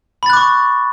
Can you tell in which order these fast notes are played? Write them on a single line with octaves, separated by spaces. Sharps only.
B5 A6 F#6 D6 C#6